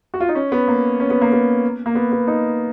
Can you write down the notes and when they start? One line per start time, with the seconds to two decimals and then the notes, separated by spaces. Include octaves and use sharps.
0.14 F#4
0.20 F4
0.29 D#4
0.35 C#4
0.52 B3
0.68 A#3
1.00 C#4
1.10 B3
1.21 A#3
1.32 B3
1.86 A#3
1.95 B3
2.12 B3
2.27 D#4